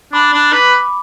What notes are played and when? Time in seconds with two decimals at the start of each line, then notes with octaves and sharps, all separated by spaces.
0.13 D4 B5 D6
0.34 D4
0.53 B4 B5 D6